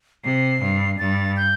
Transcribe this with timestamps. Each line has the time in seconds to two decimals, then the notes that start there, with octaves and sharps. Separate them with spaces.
0.24 C3 C7
0.62 G2
0.99 G2 A6
1.37 G6